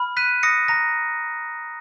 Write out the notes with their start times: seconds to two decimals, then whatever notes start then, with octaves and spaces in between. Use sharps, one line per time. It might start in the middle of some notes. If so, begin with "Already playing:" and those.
Already playing: B5 F6
0.17 F#6 B6 D#7
0.43 D#6 A#6 C#7
0.68 A#5 A#6